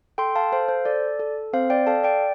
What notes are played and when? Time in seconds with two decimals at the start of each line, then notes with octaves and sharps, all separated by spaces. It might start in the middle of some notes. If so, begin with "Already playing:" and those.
0.18 A4 G5 C6
0.35 F5 A5
0.52 A4 C5 F5
0.69 C5
0.85 A4 D5
1.20 A4
1.53 C4 C5 F5
1.70 D5 G5
1.87 A4 F5 A5
2.03 D5 G5